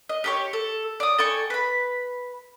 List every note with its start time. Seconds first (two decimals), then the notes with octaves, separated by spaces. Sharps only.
0.09 D#5
0.24 G4 A4 C#5
0.53 A4
1.00 D5 D#6
1.18 A4 G5 G#5 C#6
1.50 B4 B5